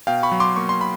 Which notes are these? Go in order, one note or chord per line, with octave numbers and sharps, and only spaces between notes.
B2 F5 G5
B5 C#6
F#3
C6 D6
A#3 C#6
C6
B5